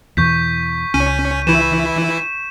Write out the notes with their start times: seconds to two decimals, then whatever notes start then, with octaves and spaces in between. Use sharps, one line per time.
0.17 E2 B2 E3 C#6 G6 B6
0.94 C#2 C#4 D#7
1.47 E3 E4 E7